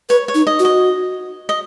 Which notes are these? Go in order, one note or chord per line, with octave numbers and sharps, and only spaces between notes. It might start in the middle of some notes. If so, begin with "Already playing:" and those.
B4 C#5
C#5
D#4
D#5
F#4
D#5
D#5